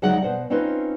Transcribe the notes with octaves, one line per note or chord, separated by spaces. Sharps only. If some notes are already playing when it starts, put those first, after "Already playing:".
D2 C#3 F#3 G#3 D#4 F#5
B2 C5 F#5
C4 C#4 D#4 F4 B4 C5